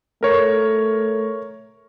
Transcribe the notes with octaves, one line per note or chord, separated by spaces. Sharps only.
A3 A#4 C#5